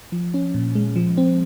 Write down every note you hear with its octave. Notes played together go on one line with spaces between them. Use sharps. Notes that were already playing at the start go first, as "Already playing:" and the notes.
F3
C#4
A#2
G#3
F3
C4